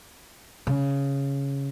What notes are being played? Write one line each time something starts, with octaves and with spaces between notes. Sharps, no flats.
C#3